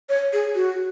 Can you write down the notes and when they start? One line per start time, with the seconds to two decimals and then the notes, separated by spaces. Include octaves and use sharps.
0.09 C#5
0.33 G#4
0.55 F#4